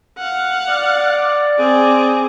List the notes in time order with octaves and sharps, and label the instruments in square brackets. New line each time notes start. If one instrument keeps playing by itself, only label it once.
[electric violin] F5 F#5
[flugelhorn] D5
[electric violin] C4 G#4